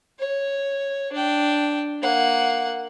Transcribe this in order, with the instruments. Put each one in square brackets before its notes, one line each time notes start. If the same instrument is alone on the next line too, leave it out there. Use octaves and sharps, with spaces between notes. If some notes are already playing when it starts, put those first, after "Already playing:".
[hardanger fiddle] C#5
D4 G5
A#3 F#5